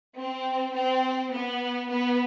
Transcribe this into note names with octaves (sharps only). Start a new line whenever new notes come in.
C4
C4
B3
B3